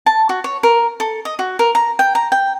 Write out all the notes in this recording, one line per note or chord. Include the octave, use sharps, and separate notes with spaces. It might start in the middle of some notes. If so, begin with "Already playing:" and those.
A5
F#4
C#5
A#4
A4
D#5
F#4
A#4
A#5
G5
A#5
G5